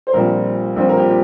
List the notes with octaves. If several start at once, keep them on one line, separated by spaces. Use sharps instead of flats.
C5
A#1 A#2 G3 C4 A#4
A#1 A#2 G3 C4
A#4
G4
G4